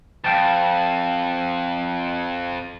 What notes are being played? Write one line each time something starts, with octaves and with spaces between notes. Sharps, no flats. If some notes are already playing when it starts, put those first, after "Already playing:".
F2 F5 G5 A5